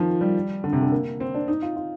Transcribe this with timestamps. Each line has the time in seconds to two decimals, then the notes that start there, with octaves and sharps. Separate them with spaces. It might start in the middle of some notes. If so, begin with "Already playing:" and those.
Already playing: D#3 F3
0.21 G3
0.64 D3
0.73 C3
0.82 D3
0.92 A#3
1.20 C4
1.35 D4
1.48 D#4
1.62 F4
1.76 F4